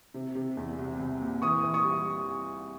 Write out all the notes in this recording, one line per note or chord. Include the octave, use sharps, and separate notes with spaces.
C3
C3
E2
C2
C2
A#2
E3 C#6 D#6
E3
C#6 D#6
G3